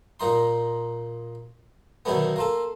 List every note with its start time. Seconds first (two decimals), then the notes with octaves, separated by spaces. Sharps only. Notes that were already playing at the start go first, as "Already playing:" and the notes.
0.20 A#2 A#3 D#4 C6
2.05 B2 D3 D#3 F#3 A3 B3
2.36 A#3 F4 A4